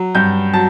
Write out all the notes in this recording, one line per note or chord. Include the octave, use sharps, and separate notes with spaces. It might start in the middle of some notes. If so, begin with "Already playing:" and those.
Already playing: F#3
G2 G6
F#3 A5